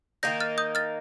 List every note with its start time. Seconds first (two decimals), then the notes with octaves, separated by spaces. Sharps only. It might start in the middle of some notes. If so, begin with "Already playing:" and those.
0.23 D#3 A#3 D#4 G6 A#6
0.40 F6 A6
0.58 D#6 G6
0.75 F6 A6